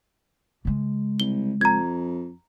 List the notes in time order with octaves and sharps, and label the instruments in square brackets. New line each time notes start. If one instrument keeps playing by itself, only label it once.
[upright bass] C#3 G#3
[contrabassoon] C2 [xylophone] G7
[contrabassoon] F2 [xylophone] A#5 G#6